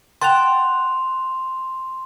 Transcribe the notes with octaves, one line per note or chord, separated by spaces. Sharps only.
F#5 G5 A5 C6 F7